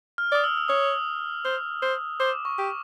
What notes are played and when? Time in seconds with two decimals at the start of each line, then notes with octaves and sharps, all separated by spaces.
0.18 F6
0.32 D5 D#6
0.44 E6
0.57 E6
0.68 C#5 D#6
1.45 C5
1.82 C5
2.20 C5 D6
2.45 C#6
2.58 G4